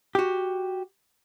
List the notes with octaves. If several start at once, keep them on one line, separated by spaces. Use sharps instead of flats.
F#4 G4